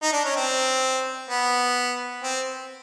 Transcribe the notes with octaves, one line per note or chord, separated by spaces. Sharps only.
D#4
D4
C#4
C4
B3
C4